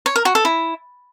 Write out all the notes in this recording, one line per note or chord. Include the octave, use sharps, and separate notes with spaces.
C#5
A#4
F#4
A4
E4